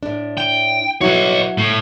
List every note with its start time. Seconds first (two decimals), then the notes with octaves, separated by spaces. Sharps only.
0.03 A2 D4
0.37 G5
1.01 F#3 E4 F#4 B4 C#5
1.58 A2